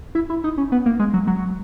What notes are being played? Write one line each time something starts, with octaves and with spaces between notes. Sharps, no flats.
E4
E4
D#4
C#4
B3
A#3
G#3
F#3
F#3